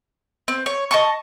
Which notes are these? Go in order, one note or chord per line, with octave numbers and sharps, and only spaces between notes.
C4
C#5
D#5 A5 C#6